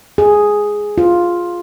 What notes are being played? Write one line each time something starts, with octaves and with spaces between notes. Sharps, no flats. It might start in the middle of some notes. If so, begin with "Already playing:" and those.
G#4
F4